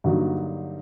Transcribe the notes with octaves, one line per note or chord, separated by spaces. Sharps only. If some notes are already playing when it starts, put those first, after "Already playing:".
G2 D3 F#3 A#3 D#4 F#4